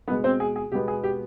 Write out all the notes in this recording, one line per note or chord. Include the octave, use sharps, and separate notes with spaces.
B2 G#3 B3 B4
C4 C5
G#4
G#4
B2 G#3 B3 G4
G#4
G4